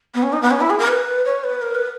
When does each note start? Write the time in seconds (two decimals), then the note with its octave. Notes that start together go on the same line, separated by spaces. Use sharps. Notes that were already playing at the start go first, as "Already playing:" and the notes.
0.14 B3
0.23 C#4
0.33 D#4
0.42 B3
0.51 C#4
0.61 E4
0.70 G#4
0.79 A#4
0.88 B4
1.26 C#5
1.44 B4
1.62 A#4
1.75 B4